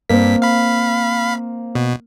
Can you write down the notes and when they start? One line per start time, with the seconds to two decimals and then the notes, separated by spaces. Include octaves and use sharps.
0.09 G2 A#3 C4 B6
0.42 F5 B5
1.75 B2